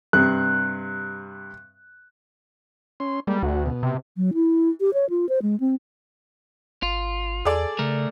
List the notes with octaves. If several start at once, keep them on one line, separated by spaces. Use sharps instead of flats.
G2 C3 F#6
C#4 C6
G3 G#3 A#3
D2 F#4
B2
C3
F#3
E4
G4
C#5
F4
C5
G#3
C4
G#1 F4
E2 G#4 A4 D5
C#3 A3 A#4